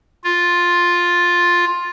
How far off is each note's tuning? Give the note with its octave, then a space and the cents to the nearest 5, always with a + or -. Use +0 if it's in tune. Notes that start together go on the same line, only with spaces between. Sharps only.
F4 +5